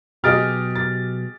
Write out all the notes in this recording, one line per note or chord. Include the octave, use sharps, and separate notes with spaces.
B2 F#3 G4 G#4 D#5 F6 A6 D7
A6